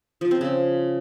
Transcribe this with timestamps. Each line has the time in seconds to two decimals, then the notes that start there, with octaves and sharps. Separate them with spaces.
0.21 F3
0.31 C4
0.41 C#3